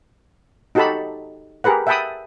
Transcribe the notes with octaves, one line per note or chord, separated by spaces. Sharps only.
D#4 F#4 G4 A4 A5 B5
G4 G#4 A#4 B4 F#5
E5 F#5 G5 A5 B5 D#6